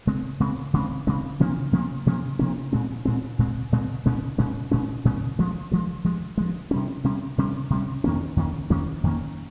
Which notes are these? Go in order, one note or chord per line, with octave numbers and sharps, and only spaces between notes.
C#3 G#3 C4
C#3 G#3 C4
C#3 G#3 C4
C#3 G#3 C4
C3 F3 A#3 C#4
C3 F3 A#3 C#4
C3 F3 A#3 C#4
C3 F3 A#3 C#4
A#2 G#3 C4
A#2 G#3 C4
A#2 G#3 C4
A#2 G#3 C4
A#2 G#3 C#4
A#2 G#3 C#4
A#2 G#3 C#4
A#2 G#3 C#4
G2 F3 G#3
G2 F3 G#3
G2 F3 G#3
G2 F3 G#3
C3 G3 C#4
C3 G3 C#4
C3 G3 C#4
C3 G3 C#4
F2 D#3 A#3 C#4
F2 D#3 A#3 C#4
F2 D#3 A#3 C#4
F2 D#3 A#3 C#4